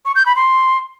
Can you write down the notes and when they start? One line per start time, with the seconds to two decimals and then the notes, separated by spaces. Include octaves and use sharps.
0.05 C#6
0.16 G6
0.26 B5
0.36 C6